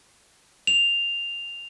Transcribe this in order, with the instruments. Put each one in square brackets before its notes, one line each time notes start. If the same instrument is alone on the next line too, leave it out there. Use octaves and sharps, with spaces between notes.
[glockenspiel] F7